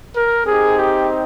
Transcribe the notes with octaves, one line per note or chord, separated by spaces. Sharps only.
A#4
C4 D#4 G4 G#4
G4